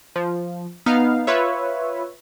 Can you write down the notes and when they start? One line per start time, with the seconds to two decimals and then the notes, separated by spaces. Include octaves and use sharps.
0.16 F3
0.86 B3 D#4 F5
1.27 F4 B4 C#5 E5